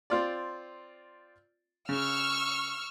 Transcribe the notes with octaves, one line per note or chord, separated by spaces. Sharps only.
C4 F4 D5
C#3 C#6 E6 F6